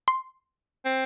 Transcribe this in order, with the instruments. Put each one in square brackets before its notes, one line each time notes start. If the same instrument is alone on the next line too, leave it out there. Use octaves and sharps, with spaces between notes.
[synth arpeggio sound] C6
[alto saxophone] C4